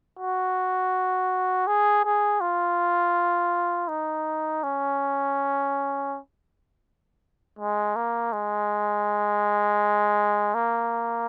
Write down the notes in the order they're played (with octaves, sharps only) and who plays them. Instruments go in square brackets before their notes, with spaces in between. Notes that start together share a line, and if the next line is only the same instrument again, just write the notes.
[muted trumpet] F#4
G#4
G#4
F4
D#4
C#4
G#3
A#3
G#3
A#3